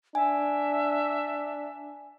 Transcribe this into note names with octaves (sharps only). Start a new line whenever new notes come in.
D4 E5 G#5